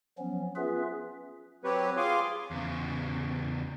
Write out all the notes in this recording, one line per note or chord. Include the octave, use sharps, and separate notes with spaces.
F3 F#3 B3 C#4
B3 C#4 F4 G#4 B4 E5
F#3 C4 G4 B4 C#5
F4 G#4 F5 G#5 C6 D6
E2 C#3